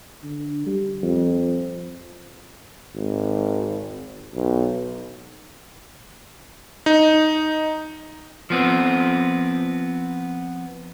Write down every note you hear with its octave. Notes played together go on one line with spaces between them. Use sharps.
D3
G3
F2
G#1
B1
D#4
F3 B3 C4